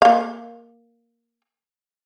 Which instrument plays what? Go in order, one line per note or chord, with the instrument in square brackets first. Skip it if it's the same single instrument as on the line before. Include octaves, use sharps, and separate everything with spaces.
[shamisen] A#3 F5